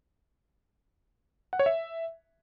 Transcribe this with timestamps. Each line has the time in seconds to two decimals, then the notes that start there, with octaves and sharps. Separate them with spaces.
1.53 F#5
1.59 C#5
1.66 E5